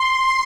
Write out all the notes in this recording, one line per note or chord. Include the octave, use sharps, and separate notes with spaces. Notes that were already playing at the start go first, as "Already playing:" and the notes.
Already playing: C6